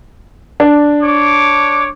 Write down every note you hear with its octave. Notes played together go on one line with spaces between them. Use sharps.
D4
C#5 D6